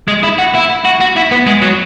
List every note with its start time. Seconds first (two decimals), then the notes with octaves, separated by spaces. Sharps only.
0.08 G#3
0.24 E4
0.39 F#4
0.55 E4
0.85 F#4
1.00 F#4
1.16 E4
1.31 B3
1.46 G#3
1.62 F#3